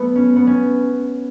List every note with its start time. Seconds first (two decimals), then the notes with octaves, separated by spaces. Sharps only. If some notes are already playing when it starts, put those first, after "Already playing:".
Already playing: A3 B3
0.15 C#4
0.36 B3
0.47 C#4